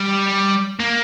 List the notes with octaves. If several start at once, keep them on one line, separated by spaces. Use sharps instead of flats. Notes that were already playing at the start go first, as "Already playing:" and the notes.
Already playing: G3
A#3